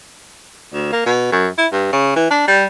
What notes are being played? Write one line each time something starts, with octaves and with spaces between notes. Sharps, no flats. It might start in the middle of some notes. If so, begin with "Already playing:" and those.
D2
A#3
B2
F#2
E4
G2
C#3
E3
D4
G3